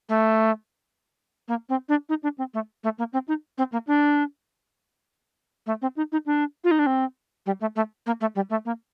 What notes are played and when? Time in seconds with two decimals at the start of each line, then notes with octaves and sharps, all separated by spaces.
0.09 A3
1.48 A#3
1.69 C4
1.89 D4
2.09 D#4
2.23 D4
2.38 C4
2.54 A3
2.84 A3
2.98 A#3
3.13 C4
3.28 D#4
3.58 C4
3.72 A#3
3.87 D4
5.66 A3
5.82 C4
5.97 D#4
6.12 D#4
6.26 D4
6.64 F4
6.71 D#4
6.79 D4
6.86 C4
7.46 G3
7.61 A3
7.76 A3
8.06 A#3
8.21 A3
8.35 G3
8.50 A3
8.65 A#3